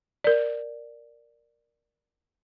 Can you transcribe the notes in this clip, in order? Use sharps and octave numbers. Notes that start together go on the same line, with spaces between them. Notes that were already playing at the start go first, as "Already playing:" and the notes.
A#4 D5